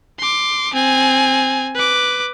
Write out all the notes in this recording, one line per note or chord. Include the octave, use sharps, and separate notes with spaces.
C6 D6
C4 G#5
B4 D6